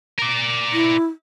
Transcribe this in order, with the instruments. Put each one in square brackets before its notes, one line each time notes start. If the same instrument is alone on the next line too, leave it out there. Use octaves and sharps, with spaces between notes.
[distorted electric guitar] A#4 D5
[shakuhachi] E4